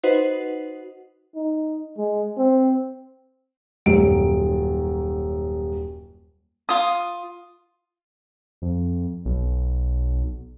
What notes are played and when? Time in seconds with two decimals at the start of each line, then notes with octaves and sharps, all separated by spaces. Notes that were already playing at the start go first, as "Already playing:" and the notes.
0.03 D#4 F#4 B4 C5 D#5 F#5
1.35 D#4
1.97 G#3
2.37 C4
3.86 D#1 F#2 F#3 D7
6.69 F4 D#6
8.62 F2
9.25 B1